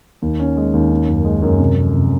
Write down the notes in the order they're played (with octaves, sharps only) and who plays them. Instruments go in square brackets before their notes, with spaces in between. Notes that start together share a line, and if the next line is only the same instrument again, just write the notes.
[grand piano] D#2
C#4
G#3
D#2
C#4
F#2
G#3
F#2
C3
F2
C3